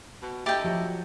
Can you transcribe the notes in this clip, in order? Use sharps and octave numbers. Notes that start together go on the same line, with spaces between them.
B2
D2 E4 G4 D#5 G5 A5
F3 F#3 G4